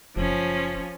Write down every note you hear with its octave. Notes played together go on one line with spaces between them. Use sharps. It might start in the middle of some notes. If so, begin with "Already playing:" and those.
F#1 F3 C#4